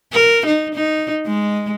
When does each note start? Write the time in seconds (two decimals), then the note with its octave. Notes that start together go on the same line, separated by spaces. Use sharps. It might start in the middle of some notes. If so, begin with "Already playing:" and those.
0.13 A#4
0.46 D#4
0.74 D#4
1.26 G#3